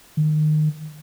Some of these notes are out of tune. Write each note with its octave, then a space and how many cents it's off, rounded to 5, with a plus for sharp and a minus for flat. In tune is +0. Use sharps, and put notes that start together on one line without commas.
D#3 -25